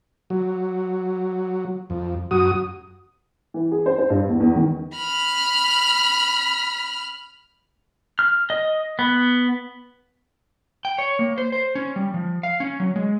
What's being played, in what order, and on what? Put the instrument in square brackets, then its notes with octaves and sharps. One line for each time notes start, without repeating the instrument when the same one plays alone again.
[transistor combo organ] F#3
F2
F#2 F#4 D#6
[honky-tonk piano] E3
G#4
C5
C5
G2
E2
E2
D#3
[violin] B5 F6
[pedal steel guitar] F6
D#5
B3
[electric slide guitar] G5
C#5
A#3
C5
C5
C#4
G3
F3
F5
C#4
F#3
G#3